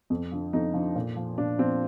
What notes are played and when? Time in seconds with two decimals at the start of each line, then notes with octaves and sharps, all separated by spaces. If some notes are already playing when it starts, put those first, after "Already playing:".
0.10 F2
0.32 D3 F3
0.53 F2 D#4
0.74 D3 F3
0.96 A#2
1.16 F3
1.38 A#2 D4
1.59 F3 C4